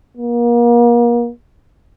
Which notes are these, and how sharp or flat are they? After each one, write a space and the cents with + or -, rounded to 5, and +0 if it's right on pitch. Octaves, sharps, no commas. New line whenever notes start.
A#3 +35